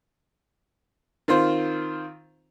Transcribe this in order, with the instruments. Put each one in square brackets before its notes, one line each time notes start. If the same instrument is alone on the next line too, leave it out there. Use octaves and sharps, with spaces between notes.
[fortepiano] D#3 C4 F4 C5